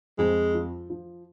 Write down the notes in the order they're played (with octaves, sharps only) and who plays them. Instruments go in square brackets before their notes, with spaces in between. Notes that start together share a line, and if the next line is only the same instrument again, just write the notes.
[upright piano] F2 [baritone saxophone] G#3
[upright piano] F3
F3